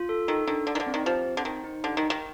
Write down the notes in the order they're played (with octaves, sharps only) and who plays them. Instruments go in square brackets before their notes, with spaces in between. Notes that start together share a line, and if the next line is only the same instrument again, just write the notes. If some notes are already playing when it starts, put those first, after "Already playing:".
Already playing: [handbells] F4
A4
[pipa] D#3 [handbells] A4
[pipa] D#3 [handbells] D4
[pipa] D3 [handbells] D5
[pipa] D#3
D3
[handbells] C4
[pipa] D#3
[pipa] F3 [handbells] G4
[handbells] C4
[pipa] D3
[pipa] D#3 [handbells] C5
[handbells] D#4
[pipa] D3 [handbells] G4
[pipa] D#3
[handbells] D#4
[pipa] D#3